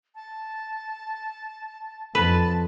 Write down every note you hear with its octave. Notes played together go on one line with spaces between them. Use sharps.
A5
F2 B4 A5